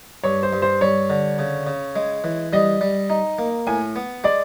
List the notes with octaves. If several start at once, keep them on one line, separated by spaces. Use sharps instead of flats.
G2 C#5
C5
G2
C5
G3 C#5
D3
C#3
C#3
G#3
E3
G3 D#5
G3
D#4
A#3
A2 G#5
B3
G#3 D5